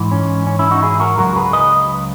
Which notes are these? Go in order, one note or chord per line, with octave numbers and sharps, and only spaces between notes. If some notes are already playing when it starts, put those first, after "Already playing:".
Already playing: G#2 E3
C#4
C#4
C#4 E4
D#4 F#4
E4 G#4
F#4 A#4
C#2 B2 F#3 F#4 A#4
G#4 B4
B4 D#5